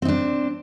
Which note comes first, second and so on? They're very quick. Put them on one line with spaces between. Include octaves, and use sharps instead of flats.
C4 D#4 D4